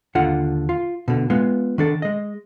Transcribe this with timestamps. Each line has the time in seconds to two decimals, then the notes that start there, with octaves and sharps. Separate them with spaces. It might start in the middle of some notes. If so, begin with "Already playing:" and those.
0.15 D#2 D3 F4 F#5
0.69 F4
1.08 B2 D3
1.30 G#3 B3 F4
1.78 D#3 D4 A4
2.02 G#3 D#5